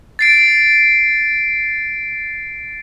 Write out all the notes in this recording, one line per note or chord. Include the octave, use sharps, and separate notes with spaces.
A6 C7 D7